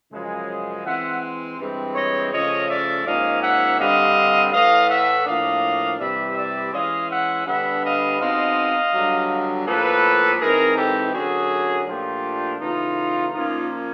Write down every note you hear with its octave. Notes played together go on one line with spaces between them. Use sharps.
F#2 C#3 F3 G#3
E3 G#3 C4 E5 F#5
G2 E3 G#3 C4
C#5 D#5
C#3 F3 A3 C#4 C#5 D#5
D5 E5
G#2 F3 A#3 C#4 D#5 F5
E5 F#5
G2 D3 G3 C4 D#5 F5
A2 E3 A3 D#5 F5
E5 F#5
A2 F3 A#3 D4 D#5 F5
C3 E3 G3 D5 E5
D5 E5
E3 G#3 C#4 D#5 F5
E5 F#5
D3 G3 B3 D4 E5 F#5
D#5 F5
B2 G#3 C4 D#4 D#5 F5
G2 D3 F#3
A2 F3 A#3 A4 B4
G#2 E3 G#3 C4 G#4 A#4
G4 A4
F#2 D3 F#3 F#4 G#4
A#2 F3 A3 D4 F4 G4
C#3 E3 A3 D#4 F4
A#2 F3 A#3 C#4 D#4 F4